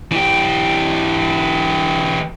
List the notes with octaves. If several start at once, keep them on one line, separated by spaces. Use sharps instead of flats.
E3 G4